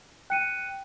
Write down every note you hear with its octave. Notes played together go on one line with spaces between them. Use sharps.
G5 F#6 C#7 D#7